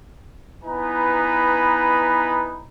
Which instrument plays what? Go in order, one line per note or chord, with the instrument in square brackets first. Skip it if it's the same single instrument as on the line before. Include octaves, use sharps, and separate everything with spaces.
[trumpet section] B3 D#4 E4 B4 G#5 A#5